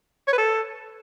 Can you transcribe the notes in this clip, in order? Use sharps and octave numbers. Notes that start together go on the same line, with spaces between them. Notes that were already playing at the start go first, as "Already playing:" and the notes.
C#5
B4
A4